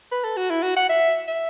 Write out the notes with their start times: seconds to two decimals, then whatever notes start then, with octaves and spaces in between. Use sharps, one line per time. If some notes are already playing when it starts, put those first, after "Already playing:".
0.12 B4
0.24 A4
0.36 F#4
0.50 E4
0.63 F#4
0.76 F#5
0.89 E5
1.28 E5